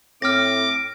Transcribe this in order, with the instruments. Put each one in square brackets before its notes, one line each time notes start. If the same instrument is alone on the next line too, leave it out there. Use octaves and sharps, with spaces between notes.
[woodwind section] A2 C4 [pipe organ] D6 [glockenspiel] F6 A#6